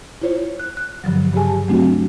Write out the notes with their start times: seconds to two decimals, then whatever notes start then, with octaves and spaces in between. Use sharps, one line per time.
0.22 E4 F4 C5 C#5
0.59 F#6
0.77 F#6
1.04 G2 D3 F3 F#3
1.33 G2 C#3 G4 G#4 G#5 A5
1.69 F#3 A3 C4 D4 F#4